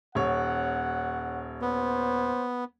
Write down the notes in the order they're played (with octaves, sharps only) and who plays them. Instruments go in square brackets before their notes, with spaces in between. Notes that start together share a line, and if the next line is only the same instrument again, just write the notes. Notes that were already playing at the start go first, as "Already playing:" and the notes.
[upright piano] D#1 C#5 [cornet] F#5
[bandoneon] B3 [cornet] C5